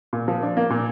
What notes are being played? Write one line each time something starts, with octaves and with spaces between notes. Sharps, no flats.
A#2
F3
D4
A#3
A#2